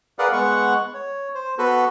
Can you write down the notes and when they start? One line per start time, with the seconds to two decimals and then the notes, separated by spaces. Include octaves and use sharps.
0.19 G#4 A#4 B4 D5 F5 F#5
0.33 G#3 B3 F#5 C#6
0.94 C#5
1.35 C5
1.58 B3 F#4 A4 B4